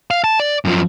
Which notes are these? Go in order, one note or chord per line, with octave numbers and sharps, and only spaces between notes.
F5
A5
D5
F#2 F3